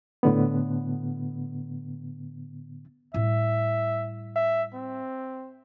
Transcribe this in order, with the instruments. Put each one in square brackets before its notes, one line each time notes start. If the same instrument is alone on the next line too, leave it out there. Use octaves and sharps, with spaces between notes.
[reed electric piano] A2 D3 B3
[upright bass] A2 G3 [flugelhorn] E5
[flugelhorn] E5
C4